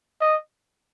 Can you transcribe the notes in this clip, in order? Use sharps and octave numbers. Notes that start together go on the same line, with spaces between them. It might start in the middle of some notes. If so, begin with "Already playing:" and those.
D#5